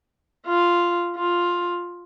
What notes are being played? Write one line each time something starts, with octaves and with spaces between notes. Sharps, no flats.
F4
F4